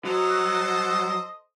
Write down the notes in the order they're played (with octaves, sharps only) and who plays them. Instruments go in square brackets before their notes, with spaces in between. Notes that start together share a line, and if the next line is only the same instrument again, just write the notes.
[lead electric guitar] F#3 [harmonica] A4 C5 D#5